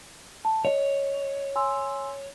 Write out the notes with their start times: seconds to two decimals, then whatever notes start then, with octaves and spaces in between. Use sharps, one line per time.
0.45 A5
0.65 C#5 D#5
1.55 G#5 C6 E6